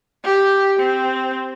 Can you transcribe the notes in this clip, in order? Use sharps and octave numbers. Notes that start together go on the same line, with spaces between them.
G4
C4